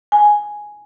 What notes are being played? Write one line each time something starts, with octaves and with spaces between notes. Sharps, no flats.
G#5